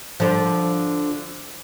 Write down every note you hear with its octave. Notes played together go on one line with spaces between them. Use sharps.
D3 F3